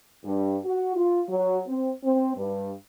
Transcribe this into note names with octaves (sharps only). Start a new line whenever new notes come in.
G2
F#4
F4
F#3
C4
C4
G2